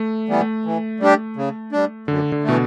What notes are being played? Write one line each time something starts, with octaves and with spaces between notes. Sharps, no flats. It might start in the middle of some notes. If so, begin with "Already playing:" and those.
Already playing: A3
E3 G3 B3
A3
E3
G3 D4 G4
C#3
G3 D4
F#2 D3
D3
B2 E3 A3